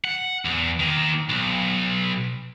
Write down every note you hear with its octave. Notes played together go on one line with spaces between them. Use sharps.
F#5
E2
D#3 A#3
B1